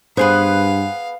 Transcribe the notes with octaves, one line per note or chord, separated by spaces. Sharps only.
G2 B3 G#4 B4 C5 F5